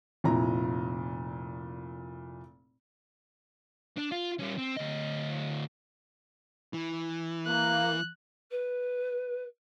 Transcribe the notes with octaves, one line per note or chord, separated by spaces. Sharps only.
F1 A#2 E4 A#5
D4
F4
G3 C#4
C4
D2 D#5
E3
A#3 F#6
B4